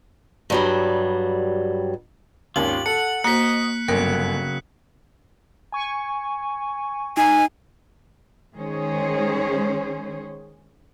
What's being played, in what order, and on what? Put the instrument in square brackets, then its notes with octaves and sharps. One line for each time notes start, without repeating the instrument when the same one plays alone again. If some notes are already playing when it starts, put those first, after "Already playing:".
[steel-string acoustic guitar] G2 F#3 G3
[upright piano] G#1 D#2 C#4 [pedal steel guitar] F4 G4 [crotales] F#7
[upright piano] A4 [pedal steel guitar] F#5 [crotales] C#7
[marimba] A#3 [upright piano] F#4 C5 [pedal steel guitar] D#5 [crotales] F#6 B6
[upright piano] G1 F#2 [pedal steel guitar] C#3 F#3 G5 [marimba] A#4 [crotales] F#6
[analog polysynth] G#5 C#6
[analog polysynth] D#4 [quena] G#5
[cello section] D#3 G#3 C#4 G#4 C5 C#5